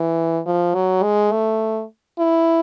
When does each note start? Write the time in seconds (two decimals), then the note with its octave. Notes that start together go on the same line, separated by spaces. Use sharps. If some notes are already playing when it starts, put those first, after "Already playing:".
Already playing: E3
0.46 F3
0.74 F#3
1.03 G#3
1.32 A3
2.18 E4